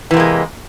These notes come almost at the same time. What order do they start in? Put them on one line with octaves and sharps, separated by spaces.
E3 C3 A#3 G#3